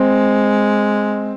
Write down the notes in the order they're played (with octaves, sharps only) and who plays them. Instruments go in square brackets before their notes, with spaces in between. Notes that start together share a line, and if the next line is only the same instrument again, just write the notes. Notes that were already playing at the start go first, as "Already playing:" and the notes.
Already playing: [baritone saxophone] G#3 [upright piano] C4